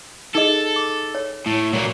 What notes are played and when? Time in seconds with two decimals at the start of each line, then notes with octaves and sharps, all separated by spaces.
0.35 D#4 G#4 A4 D#5
0.76 D6
1.15 C#5
1.46 A2
1.74 A#2 F#3